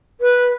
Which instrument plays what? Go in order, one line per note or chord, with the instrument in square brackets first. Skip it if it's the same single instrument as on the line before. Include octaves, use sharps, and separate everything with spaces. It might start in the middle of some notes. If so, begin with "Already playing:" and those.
[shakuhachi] B4